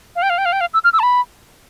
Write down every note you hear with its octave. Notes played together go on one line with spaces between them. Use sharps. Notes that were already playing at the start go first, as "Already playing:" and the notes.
F5
G5
F5
G5
F5
G5
F5
E6
F6
E6
A5
B5